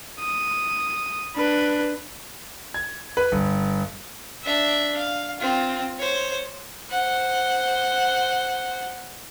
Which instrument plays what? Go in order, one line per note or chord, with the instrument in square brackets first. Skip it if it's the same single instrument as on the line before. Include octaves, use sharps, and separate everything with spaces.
[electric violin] D#6
D4 B4
[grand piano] G#6
B4
G1
[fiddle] D4 E5
F5
C4 F4
C5 C#5
[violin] C5 F#5